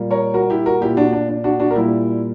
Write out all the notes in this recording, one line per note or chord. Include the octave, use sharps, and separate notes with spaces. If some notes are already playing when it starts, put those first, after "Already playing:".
Already playing: A#2 G3 A#3
A#4 C#5
F#4 A#4
E4 G4
F#4 A#4
A#2 A#3 E4 G4
D4 F#4
D4
D4
D4 F#4
D4 F#4
A#4
A#2 G3 A#3 E4 G4